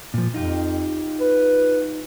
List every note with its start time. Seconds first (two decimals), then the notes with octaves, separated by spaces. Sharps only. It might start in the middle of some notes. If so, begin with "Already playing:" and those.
0.14 A#2 F3
0.34 F2 D#4 F4 G4
1.21 B4